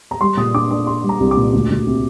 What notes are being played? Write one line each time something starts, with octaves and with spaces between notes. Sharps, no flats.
A#5
G3 C6
A#2 D#6
D4 D6
D4 D#6
D4 C6
G3
A#5
C2
D6
A#2
D2
D2
C3